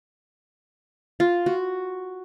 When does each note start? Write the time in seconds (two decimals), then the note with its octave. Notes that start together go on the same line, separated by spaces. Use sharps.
1.20 F4
1.46 F#4